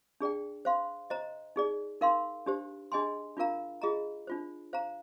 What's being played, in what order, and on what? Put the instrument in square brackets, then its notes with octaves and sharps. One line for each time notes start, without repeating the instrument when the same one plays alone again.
[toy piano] D4 G#4 D5 G5
C5 F5 C6
C5 D#5 A#5
D#4 G#4 D5
D#4 A#4 F5 C6
D4 G4 C5
D4 G#4 D#5 G#5 C6
D4 F4 A#4 F5 A#5
F4 G#4 D#5 A#5
D4 F4 C5
C5 F5 A#5